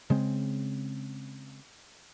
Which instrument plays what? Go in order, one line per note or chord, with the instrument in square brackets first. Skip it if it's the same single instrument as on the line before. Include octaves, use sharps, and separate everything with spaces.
[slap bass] C#3 G#3 C4